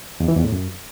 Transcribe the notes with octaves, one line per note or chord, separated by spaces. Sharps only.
E2
E3
E2
A2
F#2